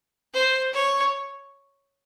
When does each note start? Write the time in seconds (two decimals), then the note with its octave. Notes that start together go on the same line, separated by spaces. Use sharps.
0.34 C5
0.74 C#5